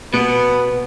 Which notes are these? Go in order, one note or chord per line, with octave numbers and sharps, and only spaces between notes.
B2 B3